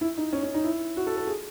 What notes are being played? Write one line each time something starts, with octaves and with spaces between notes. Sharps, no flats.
E4
D#4
C#4
C#4
D#4
E4
F#4
A4
A4
G#4